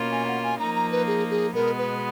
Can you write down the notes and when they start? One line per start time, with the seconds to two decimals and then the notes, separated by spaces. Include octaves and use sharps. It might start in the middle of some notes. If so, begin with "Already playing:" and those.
Already playing: B2 A#3 C#4 F4
0.12 G#5
0.28 F#5
0.44 G#5
0.59 F3 A#3 D#4 A#5
0.75 A#5
0.92 B4
1.07 G#4
1.31 G#4
1.55 B2 G#3 B3 A#4
1.78 B4